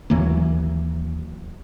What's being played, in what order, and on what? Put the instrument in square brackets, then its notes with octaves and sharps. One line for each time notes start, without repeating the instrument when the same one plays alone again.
[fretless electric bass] D#2 E3 F#3 A#3